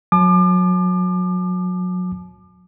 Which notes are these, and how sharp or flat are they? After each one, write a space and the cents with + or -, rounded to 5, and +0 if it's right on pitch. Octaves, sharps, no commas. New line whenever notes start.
F#3 -30 A5 -40 D6 +35